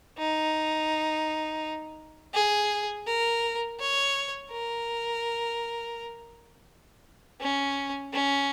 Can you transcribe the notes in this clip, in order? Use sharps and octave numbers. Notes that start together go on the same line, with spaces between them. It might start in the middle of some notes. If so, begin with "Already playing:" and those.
D#4
G#4
A#4
C#5
A#4
C#4
C#4